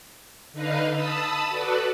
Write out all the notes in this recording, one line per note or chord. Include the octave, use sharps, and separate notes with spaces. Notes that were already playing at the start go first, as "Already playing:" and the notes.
D3 D#4 B4 D#5 F5
A5 B5 D#6 E6
F#4 A4 B4 D5